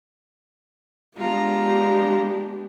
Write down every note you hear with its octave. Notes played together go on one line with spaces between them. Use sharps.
G#3 B3 D4 F4 G4 A#5